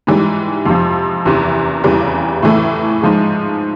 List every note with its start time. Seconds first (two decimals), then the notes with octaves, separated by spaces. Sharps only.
0.07 G#2 E3 G3
0.65 F2 C3 F3
1.25 F#1 E2 C3 E3
1.84 F1 E2 C#3 E3 G3
2.42 A2 E3 A3
3.01 G#2 F3 G#3